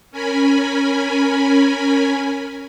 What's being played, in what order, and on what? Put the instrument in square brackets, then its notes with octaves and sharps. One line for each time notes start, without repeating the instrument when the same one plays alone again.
[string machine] C#4 A#4 G#5 B5